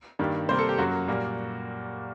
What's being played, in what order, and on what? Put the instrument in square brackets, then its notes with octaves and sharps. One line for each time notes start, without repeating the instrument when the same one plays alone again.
[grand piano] G2 D#3 G3 A#3
C3 G3 A#3 C5
A4
G4
F#2 F#3 A#3 F#4
A#2 G3 A#3